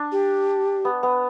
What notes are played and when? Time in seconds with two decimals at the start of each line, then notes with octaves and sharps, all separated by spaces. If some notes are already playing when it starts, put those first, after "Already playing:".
Already playing: D4
0.12 G4
0.85 B3
1.03 B3